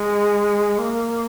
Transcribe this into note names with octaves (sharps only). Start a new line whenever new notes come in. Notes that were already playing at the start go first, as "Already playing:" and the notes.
Already playing: G#3
A#3